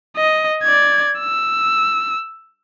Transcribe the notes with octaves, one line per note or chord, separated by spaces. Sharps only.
D#5
D5 G#6
E6